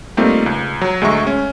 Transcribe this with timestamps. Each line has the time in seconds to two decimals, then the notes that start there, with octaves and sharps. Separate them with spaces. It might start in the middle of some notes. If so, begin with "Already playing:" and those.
0.17 G3 A3 A#3 C4 D#4 F4
0.46 C#2
0.81 F#3
1.01 D2 G#3 A3 E5 C#6
1.27 C#4